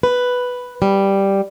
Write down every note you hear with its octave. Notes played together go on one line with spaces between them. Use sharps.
B4
G3